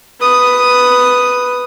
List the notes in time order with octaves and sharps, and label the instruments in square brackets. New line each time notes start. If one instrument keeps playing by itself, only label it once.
[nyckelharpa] B4 D#6